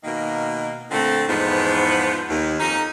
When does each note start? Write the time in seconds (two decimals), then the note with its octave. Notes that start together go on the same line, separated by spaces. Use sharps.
0.04 B2 D#3 A#3
0.91 A#2 D3 A3 C4
1.28 E2 G#2 F3 B3
2.28 D#2
2.60 F2 C#4 D#4